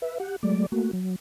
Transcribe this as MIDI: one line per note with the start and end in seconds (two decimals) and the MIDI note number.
0.02 0.18 71
0.02 0.18 76
0.20 0.36 67
0.20 0.36 78
0.43 0.66 54
0.43 0.66 56
0.43 0.66 57
0.43 0.66 74
0.72 0.91 57
0.72 0.91 58
0.72 0.91 66
0.93 1.16 54